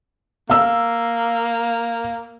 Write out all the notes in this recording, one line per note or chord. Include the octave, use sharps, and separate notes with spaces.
A#3 F5 E6